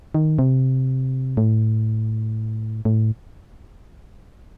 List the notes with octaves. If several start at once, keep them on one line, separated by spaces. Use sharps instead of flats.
D#3
C3
A2
A2